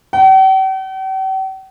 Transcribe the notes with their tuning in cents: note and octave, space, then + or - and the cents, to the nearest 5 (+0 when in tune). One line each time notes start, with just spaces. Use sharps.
G5 -45